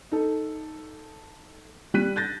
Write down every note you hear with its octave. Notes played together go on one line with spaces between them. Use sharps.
D#4 A4
G3 F#6 B6 D#7
F#6 G6 A6 A#6